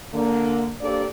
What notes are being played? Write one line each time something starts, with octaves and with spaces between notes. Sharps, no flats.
D3 A#3
A#3 D4 G4 A4 C5 D5